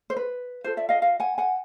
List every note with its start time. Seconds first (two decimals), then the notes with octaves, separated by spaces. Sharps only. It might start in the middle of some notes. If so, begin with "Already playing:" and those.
0.10 C5
0.16 B4
0.64 F4 A4 C5
0.77 D5 E5
0.89 D#5 F5
1.02 D#5 F5
1.20 F#5 G#5
1.38 F#5 G#5